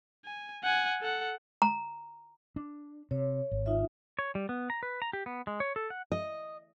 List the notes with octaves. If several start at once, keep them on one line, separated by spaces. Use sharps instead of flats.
G#5
F#5 G#5
A4 F#5
A#5
D4
C3 C#5
G#1
D#4 F4 E5
C#5
G3
B3
A#5
B4
A#5
G4
B3
G#3
C#5
A4
F#5
D#5